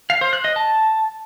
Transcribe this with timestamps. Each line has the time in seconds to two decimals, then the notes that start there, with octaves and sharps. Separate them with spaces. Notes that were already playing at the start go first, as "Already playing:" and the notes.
0.10 F5
0.21 C5
0.33 F#6
0.44 D#5
0.56 A5